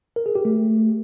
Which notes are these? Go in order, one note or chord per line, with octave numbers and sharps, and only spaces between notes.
A#4
G#4
G4
A3